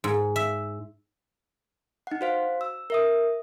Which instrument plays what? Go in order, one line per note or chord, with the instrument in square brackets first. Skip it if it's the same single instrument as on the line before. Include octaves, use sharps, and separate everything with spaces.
[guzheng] G#2
E5
[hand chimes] D#4 F#5
F#4 C5 F5
E6
A#4 E5 D#6